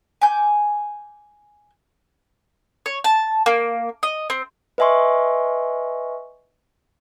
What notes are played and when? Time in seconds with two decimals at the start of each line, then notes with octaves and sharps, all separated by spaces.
0.21 G#5 D6 G6
2.86 C#5
3.04 A5
3.46 A#3
4.03 D#5
4.30 C4
4.78 B4 D#5 E5 G#5 C6 C#6